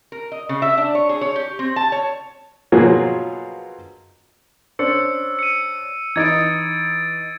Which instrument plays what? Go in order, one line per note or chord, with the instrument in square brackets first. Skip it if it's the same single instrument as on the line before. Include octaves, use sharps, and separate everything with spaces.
[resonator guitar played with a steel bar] A#4
D#5
C#3
E5
D4
C#5
G#4
C#5
G4
C4
A5
C#5
[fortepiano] B2 F3 F#3 A#3 F4 G#4
[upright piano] C#4 D4 C5 [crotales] E6 C#7
[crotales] C#7 D#7
[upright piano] E3 D#4 D#6 [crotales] G#6 A6 D7